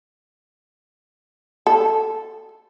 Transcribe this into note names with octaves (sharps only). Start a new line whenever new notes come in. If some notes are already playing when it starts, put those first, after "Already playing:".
A4